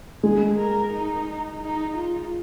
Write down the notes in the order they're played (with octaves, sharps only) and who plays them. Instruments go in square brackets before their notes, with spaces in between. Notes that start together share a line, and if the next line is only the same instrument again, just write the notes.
[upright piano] G#3 [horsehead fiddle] G#4
[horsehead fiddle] A#4
D#4
D#4
F4